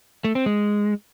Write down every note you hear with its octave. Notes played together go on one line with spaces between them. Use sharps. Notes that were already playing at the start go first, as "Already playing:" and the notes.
A3
C4
G#3